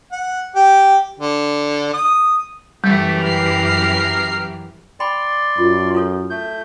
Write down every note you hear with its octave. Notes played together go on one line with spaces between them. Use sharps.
F#5
G4
D3
D#6
F#2 E3 G3 A3 G4
A#4 F6 C7
D5 G5 B5 C6
F#2 F4
E4 A4 C#5
A3 G6